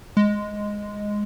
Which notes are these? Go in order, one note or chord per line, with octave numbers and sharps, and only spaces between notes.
G#3